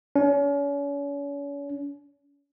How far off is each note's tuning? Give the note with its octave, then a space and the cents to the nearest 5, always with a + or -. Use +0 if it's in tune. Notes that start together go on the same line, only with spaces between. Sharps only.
C#4 +40